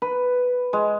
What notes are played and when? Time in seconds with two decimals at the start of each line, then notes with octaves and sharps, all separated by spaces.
0.02 B4
0.73 G#3